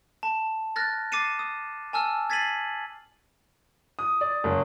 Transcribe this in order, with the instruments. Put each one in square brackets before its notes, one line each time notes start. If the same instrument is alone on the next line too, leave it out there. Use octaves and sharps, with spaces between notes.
[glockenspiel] A5
F6 F#6 A6 A#6
D6 A6 C7 C#7 D#7 E7
D#6
G#5 A5 E6 F6
G#6 A6 B6 C7 D#7 F#7
[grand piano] D#6
D5
F#1